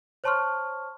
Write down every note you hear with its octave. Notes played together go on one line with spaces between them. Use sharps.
C5 C#5 A5 C6 C#6 F6